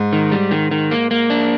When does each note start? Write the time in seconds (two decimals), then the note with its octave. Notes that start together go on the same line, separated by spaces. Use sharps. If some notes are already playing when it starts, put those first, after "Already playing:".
Already playing: G#2
0.13 D#3
0.32 G3
0.51 D#3
0.71 D#3
0.91 A#3
1.11 A#3
1.30 D4